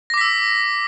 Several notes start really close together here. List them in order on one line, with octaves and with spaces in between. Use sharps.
A#6 D6 B6 E6